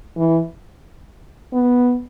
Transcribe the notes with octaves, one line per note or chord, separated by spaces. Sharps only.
E3
B3